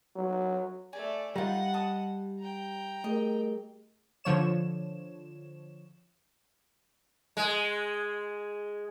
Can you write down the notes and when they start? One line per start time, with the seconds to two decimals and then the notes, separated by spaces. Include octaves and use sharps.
0.16 F#3
0.93 A3 D5 G#5
1.36 G3 D#4 F4 D#5 F#5
1.74 A5 D#6
2.39 G5 A#5
3.04 A3 G#4 A#4 D#5
4.24 D3 F3 C#5 E7
7.37 G#3